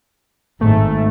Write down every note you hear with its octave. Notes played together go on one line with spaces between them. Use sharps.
G#1 G#2 A3